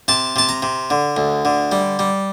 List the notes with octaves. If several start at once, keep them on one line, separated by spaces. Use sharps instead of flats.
C3 A5
C3 A5
A#5
C3
D3
D2
D3
G3
G3